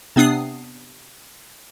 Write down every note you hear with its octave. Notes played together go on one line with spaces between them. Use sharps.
C3 B3 D4 D#6 C7